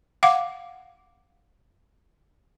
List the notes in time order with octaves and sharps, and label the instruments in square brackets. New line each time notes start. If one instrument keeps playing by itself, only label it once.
[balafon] F5 F#5 D6